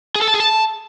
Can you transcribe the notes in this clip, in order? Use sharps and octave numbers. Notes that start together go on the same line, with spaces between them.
G#4
A4
A5
G#4
A5